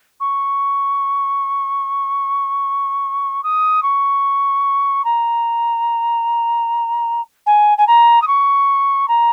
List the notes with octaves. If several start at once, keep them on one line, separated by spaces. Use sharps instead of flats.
C#6
D#6
C#6
A#5
G#5
G#5
A#5
D#6
C#6
A#5